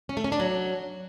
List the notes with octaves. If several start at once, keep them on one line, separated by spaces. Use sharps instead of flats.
C#4
A3
C#4
D4
F#3